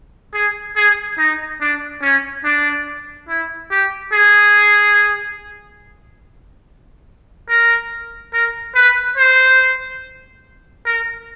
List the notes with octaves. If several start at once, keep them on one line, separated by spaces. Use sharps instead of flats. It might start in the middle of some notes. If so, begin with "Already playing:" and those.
G#4
G#4
D#4
D4
C#4
D4
E4
G4
G#4
A#4
A#4
B4
C5
A#4